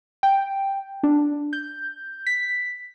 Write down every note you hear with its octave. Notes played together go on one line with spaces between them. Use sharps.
G5
D4
G6
B6